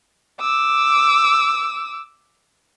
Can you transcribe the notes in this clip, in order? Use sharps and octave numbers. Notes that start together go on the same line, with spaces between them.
D6 E6